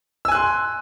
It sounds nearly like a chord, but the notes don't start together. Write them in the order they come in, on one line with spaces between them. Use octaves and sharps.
E6 G#5 F#6 C6